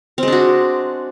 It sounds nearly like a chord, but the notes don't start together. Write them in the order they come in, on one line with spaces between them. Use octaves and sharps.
C4 G#3 D4 F#4